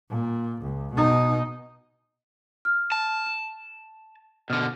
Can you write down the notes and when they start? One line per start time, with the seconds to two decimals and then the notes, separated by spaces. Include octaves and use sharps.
0.10 A#2
0.62 C#2
0.93 B2 D#4
2.65 F6
2.92 A5
3.26 E7
4.50 B2 D3 F6